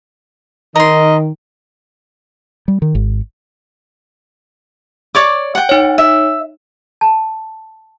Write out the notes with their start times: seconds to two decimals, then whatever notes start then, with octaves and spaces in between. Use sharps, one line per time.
0.76 D#3 A#4 D#5 C6
2.68 G3
2.82 D#3
2.95 G#1
5.15 C#5 D5 D6
5.55 F#5 G5
5.69 D#4 C#5
5.98 E5
7.01 A5